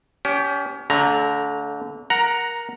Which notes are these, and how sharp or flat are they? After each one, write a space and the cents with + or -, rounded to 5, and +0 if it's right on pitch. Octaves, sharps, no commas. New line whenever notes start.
C#4 +35 G4 +0
D3 -30 A3 +0 A#5 +0
A#4 +15 F#5 +0 A#5 +0